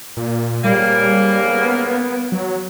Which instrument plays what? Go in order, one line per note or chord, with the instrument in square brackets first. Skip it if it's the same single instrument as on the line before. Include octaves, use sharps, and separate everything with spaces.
[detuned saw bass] A#2
[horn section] G#2 C#3 A#3 [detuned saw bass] G3
[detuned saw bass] B3
F#3